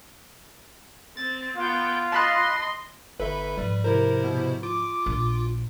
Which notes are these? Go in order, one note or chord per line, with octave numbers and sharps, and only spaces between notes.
C4 A6
B3 F4 G5
D#5 A5 B5 C6 F#6
G1 A4 B4 E5
G#2 F3 G3
C3 E4 A#4 C5
B2
F4 D6
A#1